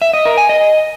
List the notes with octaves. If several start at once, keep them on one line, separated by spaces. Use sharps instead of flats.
E5
D#5
A#4
G#5
D#5